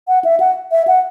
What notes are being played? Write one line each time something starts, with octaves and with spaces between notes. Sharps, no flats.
F#5
E5
F#5
E5
F#5